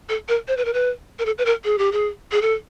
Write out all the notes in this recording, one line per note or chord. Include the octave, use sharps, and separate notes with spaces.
A4
A#4
C5
B4
A#4
B4
A#4
A4
B4
A#4
G#4
G4
G#4
G#4
A4